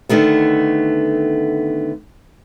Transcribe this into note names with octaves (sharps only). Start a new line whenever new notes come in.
D3 D#3 A3 B3